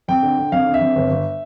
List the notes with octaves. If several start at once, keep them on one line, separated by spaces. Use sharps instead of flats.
F2 G5
D3
D3
F2 F5
D3
E5
F2
G1
G1